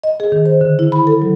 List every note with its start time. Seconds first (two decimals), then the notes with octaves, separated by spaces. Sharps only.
0.04 D#5
0.20 G#4
0.32 D#3
0.46 C5
0.61 D3
0.79 E4
0.92 B5
1.07 A4
1.22 F#3